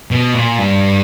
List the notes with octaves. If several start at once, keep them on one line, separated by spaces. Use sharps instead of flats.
B2
A#2
G2